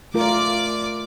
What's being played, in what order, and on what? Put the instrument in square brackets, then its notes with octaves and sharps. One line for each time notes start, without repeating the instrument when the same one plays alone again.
[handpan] A3 F4 A#4 [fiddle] D5 D6